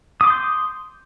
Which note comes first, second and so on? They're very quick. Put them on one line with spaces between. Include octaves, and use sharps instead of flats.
D#6 D6 C6 G6